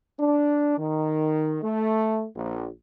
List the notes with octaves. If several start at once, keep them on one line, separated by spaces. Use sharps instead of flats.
D4
D#3
A3
A#1